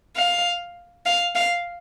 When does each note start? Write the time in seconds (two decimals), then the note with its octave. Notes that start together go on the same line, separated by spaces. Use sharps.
0.16 F5
1.06 F5
1.35 F5